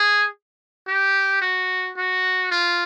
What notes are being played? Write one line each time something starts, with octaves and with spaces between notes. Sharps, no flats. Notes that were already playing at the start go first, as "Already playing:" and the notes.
Already playing: G#4
G4
F#4
F#4
F4